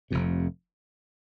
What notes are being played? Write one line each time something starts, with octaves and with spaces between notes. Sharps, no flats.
F1 F2 C3